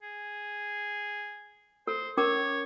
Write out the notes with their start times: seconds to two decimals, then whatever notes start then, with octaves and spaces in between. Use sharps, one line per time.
0.02 G#4
1.87 A4 C5
2.17 C#4 A#4 C#5 D6